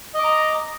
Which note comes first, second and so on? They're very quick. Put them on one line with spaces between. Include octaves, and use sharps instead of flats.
D#5 D6 A#5